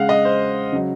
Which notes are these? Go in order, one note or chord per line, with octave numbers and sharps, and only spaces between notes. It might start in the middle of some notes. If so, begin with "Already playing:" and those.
Already playing: C#3 G#3 F5 F#5
D#5
C5
C#3 F#3